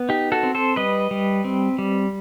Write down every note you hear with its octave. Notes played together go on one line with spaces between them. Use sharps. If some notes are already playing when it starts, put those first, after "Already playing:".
Already playing: B3
D#4 G4
F#4 A4
C4
A4 C5
G3 B4 D#5
G3
C4
G3